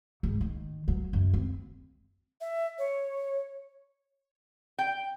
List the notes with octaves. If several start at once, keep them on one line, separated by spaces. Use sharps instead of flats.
G#2
D#3
F#3
F#2
C4
E5
C#5
G5